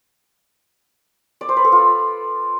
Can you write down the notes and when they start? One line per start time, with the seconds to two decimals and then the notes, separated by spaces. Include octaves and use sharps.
1.41 D5
1.49 C5
1.57 B4
1.64 A4
1.72 F4